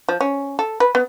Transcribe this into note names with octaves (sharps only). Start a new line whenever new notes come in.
F3
C#4
A4
B4
B3